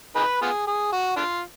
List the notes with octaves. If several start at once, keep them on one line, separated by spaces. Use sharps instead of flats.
D#4 G#4 B4
B3 F4 G#4
G#4
F#4
D4 F4